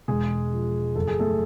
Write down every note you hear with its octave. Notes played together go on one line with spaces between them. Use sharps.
E1 G#3 G#4
F3
F#1 A4
G#4
A3 A4